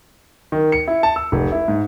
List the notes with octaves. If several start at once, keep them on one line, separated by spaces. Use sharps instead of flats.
D#3
C#7
E4
A5
E6
F1
E4
G#2